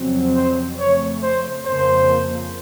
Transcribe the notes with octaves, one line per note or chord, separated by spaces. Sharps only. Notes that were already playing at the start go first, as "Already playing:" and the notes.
Already playing: F2 C#3 F#3 C4
C5
F2 C#3 A3 C#5
C5
F2 C#3 F3 A#3 C5